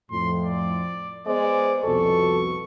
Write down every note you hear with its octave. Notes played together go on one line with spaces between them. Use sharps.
F2 A2 C6
D5
G#3 B3 C5 D5
C2 F2 B2 A4 C#6